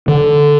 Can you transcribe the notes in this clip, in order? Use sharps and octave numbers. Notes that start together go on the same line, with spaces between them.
D3